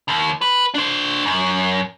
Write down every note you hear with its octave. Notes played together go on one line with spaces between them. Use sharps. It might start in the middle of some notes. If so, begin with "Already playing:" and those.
D#2
B4
D4 C5
F#2